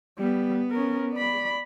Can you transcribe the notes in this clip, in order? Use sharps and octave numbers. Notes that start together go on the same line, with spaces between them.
G3 B3
C#4 A#4
D5 B5